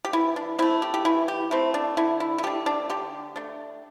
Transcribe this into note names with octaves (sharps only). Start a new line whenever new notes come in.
G4
E3 E4
D4
A3 C4 E4
G4
G4
E3 E4
G4
A3 C4 E4
D4
D3 E4
E4
E4
A3 D4 G4
D4
D3 G4
A3 D4